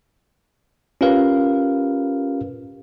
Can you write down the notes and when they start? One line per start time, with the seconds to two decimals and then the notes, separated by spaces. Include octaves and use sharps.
1.01 C#4 F4 G4 A#4 B4 F5